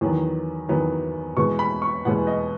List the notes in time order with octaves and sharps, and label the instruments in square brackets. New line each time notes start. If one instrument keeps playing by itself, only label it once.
[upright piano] E2 D#3 F#3 B3
E2 D#3 F#3 B3
E2 B2 G#3 B3 C#6
B5
C#6
E2 B2 G#3 B3 F#5
D#5